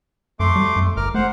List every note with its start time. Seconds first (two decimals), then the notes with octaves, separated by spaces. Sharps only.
0.40 F#2 A3 C6 D6
0.56 G3
0.76 F#2
0.97 G1 A#4 D6 F6
1.14 A3 C5 F#5